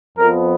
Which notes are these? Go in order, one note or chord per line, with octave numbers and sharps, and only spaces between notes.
F2 F3 B3 A#4